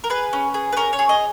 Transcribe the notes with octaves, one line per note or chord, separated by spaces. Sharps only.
A#4
G#4 B4
C#4
G#4
B4
C#4 A#4
C#5
G#4
D#5